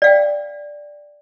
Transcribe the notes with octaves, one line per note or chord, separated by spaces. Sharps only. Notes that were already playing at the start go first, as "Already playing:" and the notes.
D5 F5 G5